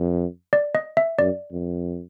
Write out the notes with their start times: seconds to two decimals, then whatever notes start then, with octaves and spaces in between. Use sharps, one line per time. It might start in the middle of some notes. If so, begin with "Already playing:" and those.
Already playing: F2
0.53 D5
0.75 D#5
0.97 E5
1.19 F#2 D5
1.52 F2